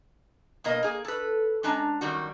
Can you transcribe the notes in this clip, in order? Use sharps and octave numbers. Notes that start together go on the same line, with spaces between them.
B2 A#3 A#4 D#5
A#3 G#4
A4 B4
G#3 C#4 D4 A5 A#5
F#2 D#3 G3 F#4